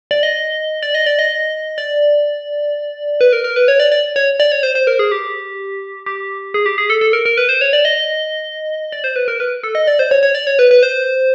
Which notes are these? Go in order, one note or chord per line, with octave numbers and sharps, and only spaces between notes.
D5
D#5
D5
D#5
D5
D#5
D5
B4
A#4
A#4
B4
C#5
D5
D5
C#5
D5
C#5
C5
C5
A#4
G#4
G4
G4
G#4
G4
G#4
A4
A4
A#4
A#4
B4
C5
C#5
D5
D#5
D5
C5
B4
A#4
B4
A4
D#5
D5
C5
C#5
C#5
D5
C#5
B4
B4
C5